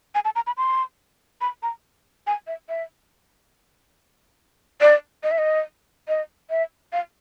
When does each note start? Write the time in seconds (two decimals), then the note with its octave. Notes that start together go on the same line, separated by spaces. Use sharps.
0.15 G#5
0.25 A5
0.36 A#5
0.47 B5
0.57 C6
1.41 B5
1.63 A#5
2.27 G#5
2.47 E5
2.69 E5
4.81 D5
5.23 D#5
5.31 E5
5.38 D#5
6.08 D#5
6.50 E5
6.93 F5